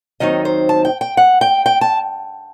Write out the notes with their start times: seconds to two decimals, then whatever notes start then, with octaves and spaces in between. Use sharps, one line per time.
0.20 D#2 D#3 F#3 C4 D#4 D#5
0.45 C5
0.69 A5
0.85 G5
1.01 G5
1.17 F#5
1.41 G5
1.66 G5
1.81 A5